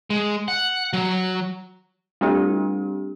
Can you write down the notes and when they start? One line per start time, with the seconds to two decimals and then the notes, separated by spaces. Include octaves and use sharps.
0.10 G#3
0.48 F#5
0.93 F#3
2.21 G3 A3 C4 D4 F4 G4